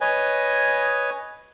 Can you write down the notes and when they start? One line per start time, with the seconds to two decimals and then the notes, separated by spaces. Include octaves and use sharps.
0.01 B4 C#5 D#5 G#5